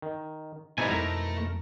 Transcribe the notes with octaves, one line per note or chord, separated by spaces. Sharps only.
D#3
D2 B2 G3 D#4 E4 A4 C5 G#5
B1 F2 A3 A#4 A#5